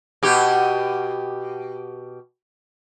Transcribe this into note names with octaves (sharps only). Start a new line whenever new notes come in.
B2 G4